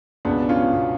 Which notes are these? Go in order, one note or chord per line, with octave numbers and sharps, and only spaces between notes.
C#2 B2 B3 D4
C#4 F4
B2